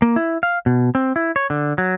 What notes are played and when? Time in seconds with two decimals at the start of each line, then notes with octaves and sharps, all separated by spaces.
0.02 A#3
0.16 E4
0.43 F5
0.66 B2
0.95 C4
1.16 E4
1.36 C#5
1.50 D3
1.78 F#3